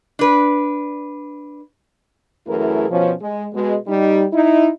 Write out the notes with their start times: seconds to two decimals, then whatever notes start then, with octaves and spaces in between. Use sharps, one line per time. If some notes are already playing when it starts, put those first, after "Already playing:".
0.19 D4 B4
2.47 F#2 E3 A3 E4 G#4 A#4
2.91 B2 F3 C#4
3.21 G#3
3.53 B2 G#3
3.87 G3 D#4
4.33 D#4 E4